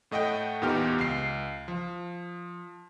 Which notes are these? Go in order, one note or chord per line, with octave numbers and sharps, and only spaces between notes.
A2 A3 D#5 F#5 G5
E2 A#2 B3 D#4 G4 F6
C#2 C7
F3